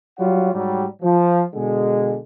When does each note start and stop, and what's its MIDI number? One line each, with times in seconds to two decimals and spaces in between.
0.18 0.51 54
0.18 0.51 55
0.18 0.51 65
0.18 0.51 73
0.18 0.51 78
0.53 0.85 44
0.53 0.85 54
0.53 0.85 55
1.03 1.43 53
1.54 2.18 47
1.54 2.18 50
1.54 2.18 56